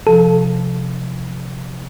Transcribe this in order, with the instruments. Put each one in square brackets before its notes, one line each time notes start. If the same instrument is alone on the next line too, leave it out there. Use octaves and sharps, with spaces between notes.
[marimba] C3 F3 [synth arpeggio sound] A4